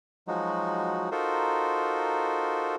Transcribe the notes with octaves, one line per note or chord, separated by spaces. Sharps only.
F3 F#3 G#3 D#4 F#4
D#4 F4 F#4 A4 A#4 C5